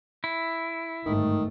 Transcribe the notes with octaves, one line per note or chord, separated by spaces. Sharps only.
E4
G1 G#2 D#3 A3